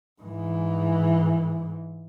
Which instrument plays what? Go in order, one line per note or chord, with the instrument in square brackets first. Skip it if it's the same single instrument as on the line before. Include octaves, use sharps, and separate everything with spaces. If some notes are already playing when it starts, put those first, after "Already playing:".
[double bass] G#2 E3